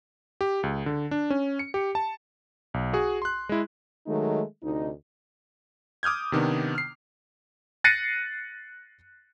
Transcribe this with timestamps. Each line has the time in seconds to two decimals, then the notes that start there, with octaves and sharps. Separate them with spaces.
0.41 G4
0.63 C#2
0.86 D3
1.11 D4
1.30 C#4
1.59 C#7
1.74 G4
1.95 A5
2.74 B1
2.93 F#4 G#4
3.22 C6 F#6
3.49 G#3 E4
4.07 D#3 F#3 G#3 A3 D#4
4.63 D2 C3 D#4
6.03 D6 D#6 F6 G6 G#6
6.32 C3 D#3 B3 D4
6.75 F6 C7
7.84 F#6 A6 A#6 C7 C#7 D#7